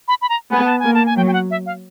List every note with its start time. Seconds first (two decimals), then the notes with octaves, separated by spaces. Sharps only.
0.08 B5
0.22 B5
0.29 A#5
0.51 B3 G#5
0.65 A5
0.79 G#5
0.85 A#3
0.94 A5
1.06 G#5
1.17 F#3 G5
1.27 G5
1.33 F#5
1.51 E5
1.66 F5